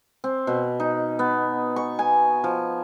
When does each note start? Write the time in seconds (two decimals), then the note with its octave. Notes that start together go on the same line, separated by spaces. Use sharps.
0.24 C4
0.47 B2
0.80 D#4
1.19 B3
1.76 C#6
1.99 G#5
2.44 F3